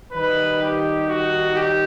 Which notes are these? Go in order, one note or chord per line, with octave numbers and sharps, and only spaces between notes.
D#3 G3 D#4 B4
G4
F#4
G4